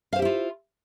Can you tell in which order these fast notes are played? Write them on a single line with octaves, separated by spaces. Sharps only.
F5 C5 G4 E4 F4